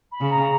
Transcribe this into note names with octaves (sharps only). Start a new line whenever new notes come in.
B5
C#3
A#5